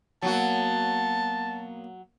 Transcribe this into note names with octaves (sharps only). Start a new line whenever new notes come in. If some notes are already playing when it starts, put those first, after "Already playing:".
B2 F#3 A#3 F#4 A5